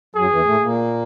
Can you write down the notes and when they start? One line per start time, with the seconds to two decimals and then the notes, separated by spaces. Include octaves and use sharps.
0.15 F#2 F#3 G#4
0.30 E2 E3
0.45 A2 A3
0.60 A#2 A#3